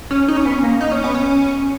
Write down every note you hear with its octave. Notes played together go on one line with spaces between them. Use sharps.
C#4
D#4
C#4
B3
C#4
A#3
D#4
C#4
B3
C#4